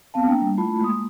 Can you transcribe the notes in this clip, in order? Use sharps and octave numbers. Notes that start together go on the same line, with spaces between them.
B3 C4 F5 A5
A#3 D4 G5
G3
A3 E4 F4 A5 B5
G#3 A#3 C6 D#6